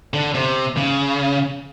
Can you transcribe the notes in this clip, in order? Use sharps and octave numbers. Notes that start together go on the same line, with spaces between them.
D3
C3
C#3